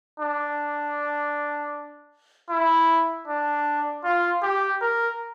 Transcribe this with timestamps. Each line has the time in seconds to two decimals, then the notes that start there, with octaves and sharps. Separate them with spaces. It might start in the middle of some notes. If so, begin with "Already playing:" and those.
0.20 D4
2.50 E4
3.28 D4
4.04 F4
4.43 G4
4.81 A#4